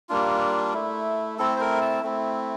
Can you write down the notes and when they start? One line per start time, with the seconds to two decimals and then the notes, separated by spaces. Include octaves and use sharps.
0.09 G3 A#3 D4 F4
0.74 A3 E4
1.39 A3 C4 E4 A4
1.56 C5
1.60 A#4
1.81 A5
2.03 A3 C4 E4